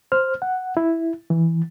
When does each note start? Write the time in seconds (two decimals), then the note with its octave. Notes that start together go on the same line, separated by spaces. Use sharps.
0.12 C5 F6
0.42 F#5
0.77 E4
1.30 E3